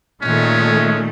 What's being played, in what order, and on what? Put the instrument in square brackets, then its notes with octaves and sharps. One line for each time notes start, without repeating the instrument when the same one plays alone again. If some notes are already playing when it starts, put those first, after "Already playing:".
[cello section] A#2 D#3 A3 [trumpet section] G#3 C#4